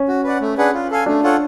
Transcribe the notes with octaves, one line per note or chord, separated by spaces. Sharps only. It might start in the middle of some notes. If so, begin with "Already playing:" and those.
Already playing: C#4
F#4
B4 D5 F#5
A3
D4 G#4 B4 F#5
F4
A4 F5 G#5
A3 D4
F4 A4 C#5 F#5